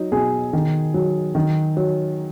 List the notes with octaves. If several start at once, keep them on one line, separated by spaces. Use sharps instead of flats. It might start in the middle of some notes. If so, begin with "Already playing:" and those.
Already playing: F#3 D#4
B2 G#4
D#3
F#3
D#3
F#3